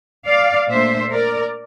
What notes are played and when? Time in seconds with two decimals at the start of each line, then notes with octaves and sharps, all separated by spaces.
0.26 D5 F5
0.69 A#2 A3 D4 C5 E5
1.11 A#4 D5